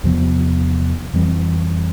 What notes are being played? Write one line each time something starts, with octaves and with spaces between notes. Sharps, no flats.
E2 C3 F3 B3
F2 E3 G3 C4